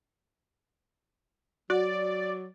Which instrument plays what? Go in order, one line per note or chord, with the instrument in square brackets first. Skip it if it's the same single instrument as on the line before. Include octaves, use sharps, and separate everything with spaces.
[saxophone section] F#3 [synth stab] F#4 [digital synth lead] D5